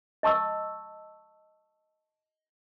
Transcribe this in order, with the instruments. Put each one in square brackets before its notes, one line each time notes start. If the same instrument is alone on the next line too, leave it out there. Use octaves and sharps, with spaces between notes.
[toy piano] D#5 A5 C#6 E6